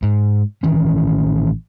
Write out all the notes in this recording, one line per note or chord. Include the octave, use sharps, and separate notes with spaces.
G#2
A1 D#3 E3 C#4